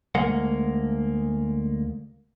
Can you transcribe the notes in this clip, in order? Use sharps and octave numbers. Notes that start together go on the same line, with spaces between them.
D2 G#3 A#3 F#5